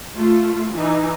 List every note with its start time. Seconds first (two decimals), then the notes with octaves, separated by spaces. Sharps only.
0.15 A3 F4
0.74 E3 D#4